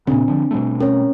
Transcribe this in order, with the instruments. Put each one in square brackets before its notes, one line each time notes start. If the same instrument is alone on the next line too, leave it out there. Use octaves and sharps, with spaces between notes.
[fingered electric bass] A#2 C#3 [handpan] C4 [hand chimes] D4
[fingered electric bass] D3 F3
B2 G3 A3
[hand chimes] C#4 C#5 [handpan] A#4